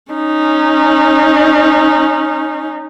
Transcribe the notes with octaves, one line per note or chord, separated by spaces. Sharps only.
C#4 D#4